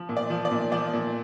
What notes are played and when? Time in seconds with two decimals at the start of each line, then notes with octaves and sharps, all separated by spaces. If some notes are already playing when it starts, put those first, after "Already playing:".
Already playing: F3
0.09 A#2
0.17 D5
0.30 F3
0.45 D5
0.51 A#2
0.72 F3 D5
0.94 A#2